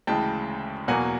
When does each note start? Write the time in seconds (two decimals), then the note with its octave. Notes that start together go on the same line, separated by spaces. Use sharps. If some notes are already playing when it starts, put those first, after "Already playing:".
0.07 D2 C#3 E3 G#3 G5 A5
0.88 E2 B2 F#3 A#3 F#5 G#5